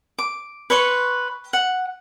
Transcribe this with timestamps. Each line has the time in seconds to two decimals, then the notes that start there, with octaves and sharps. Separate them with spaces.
0.18 D6
0.70 B4 C#5 C6 C#6
1.53 F#5